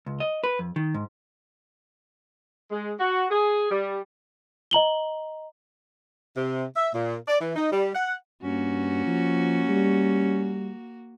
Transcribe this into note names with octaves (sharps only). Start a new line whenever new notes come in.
C#2
D#5
B4
F2
D#3
G#2
G#3
F#4
G#4
G3
D#5 A#5 F#7 G7
C3
E5
A#2
D5
E3
D#4
G3
F#5
G2 A#3 C#4 F#4
F3
G3